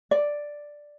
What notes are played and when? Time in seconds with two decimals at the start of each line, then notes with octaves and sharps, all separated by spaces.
0.11 D5